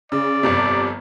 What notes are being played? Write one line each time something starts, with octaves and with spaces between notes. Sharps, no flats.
C#3 D5
G1 F2 C3